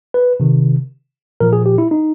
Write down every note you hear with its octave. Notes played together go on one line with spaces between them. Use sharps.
B4
C3 D#3
A#2 F3 A#4
G#4
G4
E4
D#4